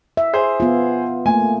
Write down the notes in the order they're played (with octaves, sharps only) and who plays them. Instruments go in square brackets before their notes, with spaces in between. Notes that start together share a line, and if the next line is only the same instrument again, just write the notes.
[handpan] E5
[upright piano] G#4 C5
[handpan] B3 F4
[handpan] A3 A#3 [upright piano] G#5